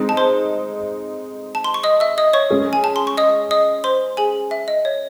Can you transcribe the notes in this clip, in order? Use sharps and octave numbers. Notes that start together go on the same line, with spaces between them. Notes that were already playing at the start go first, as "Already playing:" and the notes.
Already playing: G#3 C4 D#4
A5
C5 C6
A5
C6
C#6
D#5 D#6
E5 E6
D#5 D#6
C#5 C#6
G#3 C#4 G#4
G#5
A5
C6
C#6
D#5 D#6
D#5 D#6
C5 C6
G#4 G#5
E5
D#5
C#5